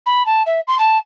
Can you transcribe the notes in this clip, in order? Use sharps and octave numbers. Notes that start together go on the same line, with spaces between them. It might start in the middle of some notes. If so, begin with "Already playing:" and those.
B5
A5
E5
C6
A5